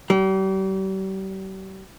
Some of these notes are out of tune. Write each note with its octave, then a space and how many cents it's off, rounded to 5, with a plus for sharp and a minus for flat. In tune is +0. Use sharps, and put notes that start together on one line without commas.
G3 -40